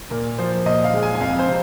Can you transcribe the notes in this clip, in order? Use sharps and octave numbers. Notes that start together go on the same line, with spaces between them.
A#2 A#4
F3 C5
A#2 D#5
F5
G#3
G#5
G#5
F2 F5
C5
C3